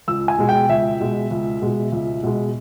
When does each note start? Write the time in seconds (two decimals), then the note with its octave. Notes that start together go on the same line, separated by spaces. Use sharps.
0.08 C#2 E6
0.28 G#5
0.38 B2 G#3
0.49 G5
0.69 C#2 E5
1.00 B2 G#3
1.31 C#2
1.62 B2 G#3
1.92 C#2
2.23 B2 G#3